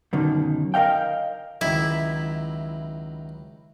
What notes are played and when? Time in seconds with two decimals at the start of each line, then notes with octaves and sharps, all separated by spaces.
0.13 F#2 B2 D3 D#3
0.74 A#4 D#5 F5 G5
1.61 C#2 D#3 F#3 E4